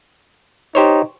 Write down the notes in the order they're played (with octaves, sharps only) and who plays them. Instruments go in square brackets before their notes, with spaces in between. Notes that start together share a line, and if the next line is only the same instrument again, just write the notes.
[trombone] D#4 [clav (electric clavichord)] G4 C5 C#5